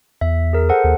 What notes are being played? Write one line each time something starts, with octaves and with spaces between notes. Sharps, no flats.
E2 E5
G#4 A#4
A4 C5 F#5
D#2